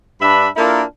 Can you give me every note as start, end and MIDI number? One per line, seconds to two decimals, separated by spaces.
0.21 0.47 43
0.21 0.47 62
0.21 0.47 71
0.21 0.47 76
0.21 0.47 83
0.56 0.82 58
0.56 0.82 62
0.56 0.82 64
0.56 0.82 65
0.56 0.82 69
0.56 0.82 70